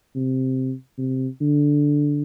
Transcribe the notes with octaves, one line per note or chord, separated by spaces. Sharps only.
C3
C3
D3